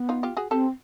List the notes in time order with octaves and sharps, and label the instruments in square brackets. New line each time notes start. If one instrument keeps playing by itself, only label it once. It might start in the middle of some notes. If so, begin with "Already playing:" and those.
Already playing: [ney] B3
[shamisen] D#4 F4
F4 G4
F#4 G#4
[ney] C4 [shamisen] G4 A4